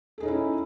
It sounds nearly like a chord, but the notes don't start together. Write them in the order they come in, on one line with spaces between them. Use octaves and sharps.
A4 G#4 D#4 C#4 E4